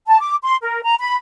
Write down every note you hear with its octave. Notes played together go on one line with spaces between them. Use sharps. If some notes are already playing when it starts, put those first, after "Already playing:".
A5
D6
C6
A#4
A#5
B5